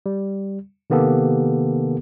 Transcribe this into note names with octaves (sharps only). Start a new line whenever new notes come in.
G3
C3 D#3 A#3 B3 G4 A4